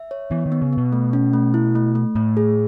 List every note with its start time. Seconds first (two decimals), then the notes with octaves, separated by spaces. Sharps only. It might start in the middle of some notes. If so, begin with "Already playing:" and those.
Already playing: E5
0.11 C#5
0.31 E3 B3
0.46 D#3
0.52 B3
0.62 C#3
0.73 B2 B3
0.92 A3
1.13 C#4
1.33 A3
1.54 E4
1.75 A3
1.95 A3
2.16 A2 A3
2.37 G#4